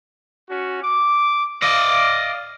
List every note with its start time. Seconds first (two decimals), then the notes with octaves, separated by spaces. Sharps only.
0.48 C#4 F#4
0.83 D6
1.62 D5 D#5 F5